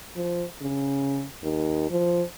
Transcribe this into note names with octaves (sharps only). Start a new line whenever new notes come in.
F3
C#3
D#2
F3